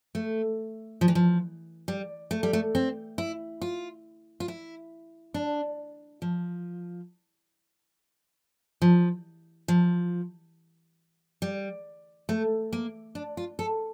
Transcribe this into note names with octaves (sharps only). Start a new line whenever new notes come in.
A3
F3
E3
F3
G3
A3
G3
A3
C4
E4
F4
F4
E4
D4
F3
F3
F3
G3
A3
A#3
D4
F4
A4